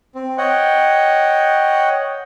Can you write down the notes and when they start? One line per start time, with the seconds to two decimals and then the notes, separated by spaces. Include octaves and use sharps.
0.15 C4
0.38 C#5 D#5 F#5 G5